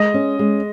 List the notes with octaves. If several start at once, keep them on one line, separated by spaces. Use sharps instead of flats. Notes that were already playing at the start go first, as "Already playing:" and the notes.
Already playing: G#3 D#5
C#4
G#3